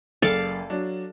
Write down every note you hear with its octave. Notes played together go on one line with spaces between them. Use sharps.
F#1 A4 D5 F5
F#3 D4